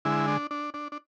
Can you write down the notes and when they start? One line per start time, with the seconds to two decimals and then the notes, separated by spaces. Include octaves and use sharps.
0.05 D3 G#3 E4
0.28 D4
0.51 D4
0.74 D4
0.92 D4